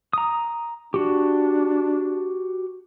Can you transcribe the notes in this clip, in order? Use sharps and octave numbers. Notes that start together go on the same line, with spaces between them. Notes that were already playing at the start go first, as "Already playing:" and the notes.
A#5 D#6
D4 F#4 G4